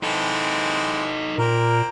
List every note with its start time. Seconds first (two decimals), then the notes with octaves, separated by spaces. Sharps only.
0.03 E3 G#3 C4 D#4 A4
1.38 A#2 A#3 C4 A#4